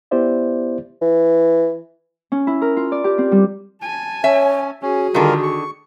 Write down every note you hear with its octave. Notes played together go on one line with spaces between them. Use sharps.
B3 E4 G4 C5 D5 E5
E3
C#4
E4
A#4
F4
D5
G4
C4
G3
G#5 A5
C#4 C#5 E5
C#4 F#4 G#4
D3 D#3 G3 F4 A#4
C#6